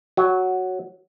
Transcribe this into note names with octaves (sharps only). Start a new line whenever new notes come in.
F#3